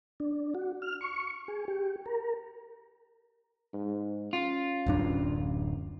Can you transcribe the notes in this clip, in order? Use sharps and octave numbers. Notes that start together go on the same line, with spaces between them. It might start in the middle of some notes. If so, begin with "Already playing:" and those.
D4
F#4
F6
C#6
G#4
G4
A#4
G#2
C#4 F4
D1 F#2 D4